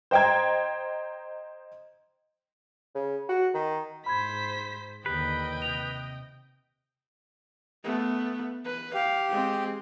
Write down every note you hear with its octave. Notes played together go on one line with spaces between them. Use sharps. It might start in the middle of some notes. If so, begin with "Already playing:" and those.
C5 D#5 G5 A#5 G#6
C#3
F#4
D#3
G#2 C5 B5 G#6 B6
D#2 D3 G4 B4 D#5 G5
C3 F7
A3 B3
B4
G4 F5
G#3 C4